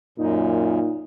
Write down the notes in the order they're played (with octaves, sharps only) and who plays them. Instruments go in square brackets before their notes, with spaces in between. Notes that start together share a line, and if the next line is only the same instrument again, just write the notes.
[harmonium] F#2 [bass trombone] A#2 [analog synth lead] D#4